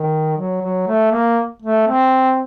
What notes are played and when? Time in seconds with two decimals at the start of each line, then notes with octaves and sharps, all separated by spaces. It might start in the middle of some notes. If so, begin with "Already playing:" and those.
Already playing: D#3
0.38 F#3
0.62 F#3
0.87 A3
1.12 A#3
1.62 A3
1.87 C4